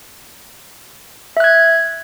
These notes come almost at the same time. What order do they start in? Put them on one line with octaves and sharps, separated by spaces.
E5 F#6 G#6